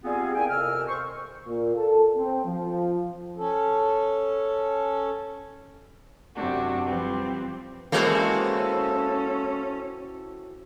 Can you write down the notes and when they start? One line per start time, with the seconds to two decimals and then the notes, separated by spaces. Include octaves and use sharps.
0.03 G3 B3 C4 F4 G#4
0.35 A#3 E4 G5 G#5
0.49 F2 C3 A#4 E6 F6
0.88 C5 C#6
1.45 A#2
1.75 A4
2.15 C4
2.45 F3
3.37 C#4 A4
6.34 F#2 C3 D4 F#4
6.86 F3 G3 C4 B4
7.92 E3 G#3 A#3 C4 C#4 F#4 A4